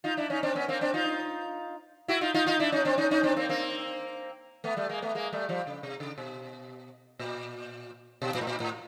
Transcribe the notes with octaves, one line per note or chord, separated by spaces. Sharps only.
D#4 F4
D4 E4
C#4 D#4
C4 D4
B3 C#4
A#3 C4
C4 D4
D#4 F4
E4 F#4
D#4 F4
D#4 F4
D#4 F4
D4 E4
C#4 D#4
C4 D4
C#4 D#4
C#4 D#4
C4 D4
A#3 C4
A#3 C4
A3 B3
G3 A3
G#3 A#3
A3 B3
G#3 A#3
G3 A3
F3 G3
C#3
C3
C#3
B2
A#2
B2
A#2
A2
A#2
A2